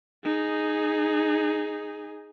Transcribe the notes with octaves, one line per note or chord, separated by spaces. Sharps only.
D#4 G#4